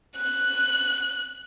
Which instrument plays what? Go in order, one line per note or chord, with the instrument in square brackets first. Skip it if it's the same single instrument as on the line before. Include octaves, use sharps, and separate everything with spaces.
[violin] F#6